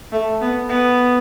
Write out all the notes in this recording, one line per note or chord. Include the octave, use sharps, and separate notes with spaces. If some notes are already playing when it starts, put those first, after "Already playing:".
A3
B3
B3